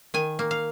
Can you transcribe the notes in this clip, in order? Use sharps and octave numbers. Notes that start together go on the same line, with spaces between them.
D#3 G#5
A#3
F5